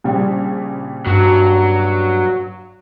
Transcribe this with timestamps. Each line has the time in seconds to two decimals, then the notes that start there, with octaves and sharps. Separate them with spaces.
0.04 A#1 C#3 G3
1.07 G2 F#3